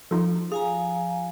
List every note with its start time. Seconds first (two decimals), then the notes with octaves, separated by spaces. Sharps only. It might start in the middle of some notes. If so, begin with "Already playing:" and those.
0.11 F3 D#4 F4 A4
0.52 G#4 F5 G#5 A#5